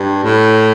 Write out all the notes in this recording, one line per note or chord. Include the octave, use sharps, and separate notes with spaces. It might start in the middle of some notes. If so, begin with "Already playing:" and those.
Already playing: G2
A2